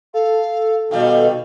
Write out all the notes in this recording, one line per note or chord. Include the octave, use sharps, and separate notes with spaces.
A4 F5
B2 D#3 G3 F5